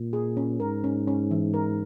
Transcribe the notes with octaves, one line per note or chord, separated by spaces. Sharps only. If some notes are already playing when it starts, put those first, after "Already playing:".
Already playing: A#2
G#4
C#4
G#2 A#4
C#4
C#4
E3
A#4